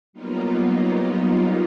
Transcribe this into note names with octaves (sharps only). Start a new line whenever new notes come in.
F#3 G3 A#3 B3 D#4 F4